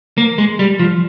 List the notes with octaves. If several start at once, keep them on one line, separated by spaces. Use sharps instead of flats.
A#3
G#3
G3
F3